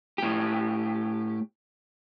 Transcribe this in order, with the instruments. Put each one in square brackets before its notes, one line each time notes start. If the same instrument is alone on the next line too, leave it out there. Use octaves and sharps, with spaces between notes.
[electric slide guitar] A2 G4